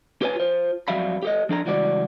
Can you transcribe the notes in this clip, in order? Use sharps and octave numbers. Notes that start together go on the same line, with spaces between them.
G4 B4 C#5 G#5
F4 C5
F2 F#3 G3 E5 F5 B5
G4 A4 D#5
F3 D4 A4 A#5
C#2 E3 G3 F#4 C5 D5